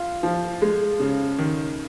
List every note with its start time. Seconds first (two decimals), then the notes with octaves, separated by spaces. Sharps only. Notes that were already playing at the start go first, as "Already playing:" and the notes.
Already playing: F4
0.23 F3
0.62 G#3
1.00 C#3
1.38 D#3